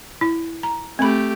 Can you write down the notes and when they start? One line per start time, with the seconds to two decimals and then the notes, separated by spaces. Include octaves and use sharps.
0.21 E4
0.63 A#5
0.99 A3 C4 G4 B5